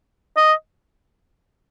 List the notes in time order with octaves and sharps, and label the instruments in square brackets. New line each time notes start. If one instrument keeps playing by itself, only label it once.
[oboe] D#5